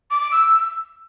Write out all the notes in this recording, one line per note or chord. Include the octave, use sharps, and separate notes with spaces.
D6
D6
E6